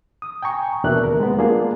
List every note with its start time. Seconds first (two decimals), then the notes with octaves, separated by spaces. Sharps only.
0.22 D#6
0.42 G5 G#5 A#5 C#6
0.84 E2 B2 D4 A#4 E5 F#6
1.04 D#2 A#4
1.20 G#3 B3
1.38 G#3 A#3 D4 F4 G#4